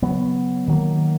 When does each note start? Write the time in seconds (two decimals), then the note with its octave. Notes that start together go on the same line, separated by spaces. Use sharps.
0.02 C#3 F#3 B3
0.68 D#3 F#3 A#3